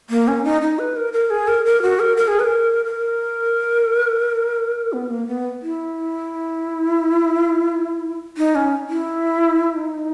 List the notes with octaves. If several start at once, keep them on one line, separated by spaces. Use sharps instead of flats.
A#3
C#4
D#4
D#4
B4
A#4
A#4
G#4
A#4
A#4
F#4
A#4
A#4
G#4
B4
A#4
A#4
B3
A#3
B3
E4
D#4
C#4
E4
D#4